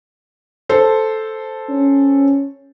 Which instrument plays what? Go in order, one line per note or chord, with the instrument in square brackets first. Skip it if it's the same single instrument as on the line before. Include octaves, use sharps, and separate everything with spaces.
[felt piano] A4 C5
[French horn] C#4